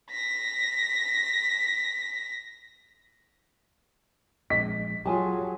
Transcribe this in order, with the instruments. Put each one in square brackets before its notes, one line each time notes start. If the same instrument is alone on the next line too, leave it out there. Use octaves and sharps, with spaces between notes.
[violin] A#6 B6
[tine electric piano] A#1 G#3 [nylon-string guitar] D#5 [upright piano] B6
[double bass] F#3 [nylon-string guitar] F4 G#5 A5 [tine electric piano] G4 G#4